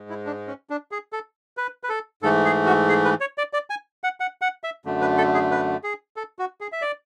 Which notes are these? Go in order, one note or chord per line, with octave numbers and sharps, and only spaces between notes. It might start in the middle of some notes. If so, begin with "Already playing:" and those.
Already playing: G#2 G#3
E4
D4
C#4
D4
G#4
A4
B4
B4
A4
G#2 E3 A3 A4
G#4
F#4
G#4
B4
C#5
D5
D5
G#5
F#5
F#5
F#5
E5
F#2 D3 A3
B4
A4
G#4
B4
G#4
A4
F#4
G#4
E5
D5